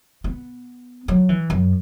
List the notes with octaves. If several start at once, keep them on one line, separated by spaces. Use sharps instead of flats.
B3
F#3
E3
F#2